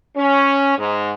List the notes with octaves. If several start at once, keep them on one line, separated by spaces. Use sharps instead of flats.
C#4
G#2